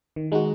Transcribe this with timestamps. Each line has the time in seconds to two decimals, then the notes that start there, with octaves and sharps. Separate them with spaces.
0.16 D#3
0.32 G#3 D#4 F#4